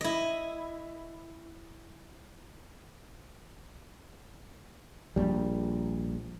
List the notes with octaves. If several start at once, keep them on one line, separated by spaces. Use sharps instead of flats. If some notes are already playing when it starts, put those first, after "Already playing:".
E4 D#5
A#1 G3